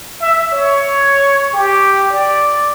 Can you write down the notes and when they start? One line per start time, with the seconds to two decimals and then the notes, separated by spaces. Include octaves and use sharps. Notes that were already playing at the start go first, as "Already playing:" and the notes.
0.21 E5
0.52 C#5
1.54 G4
2.11 D5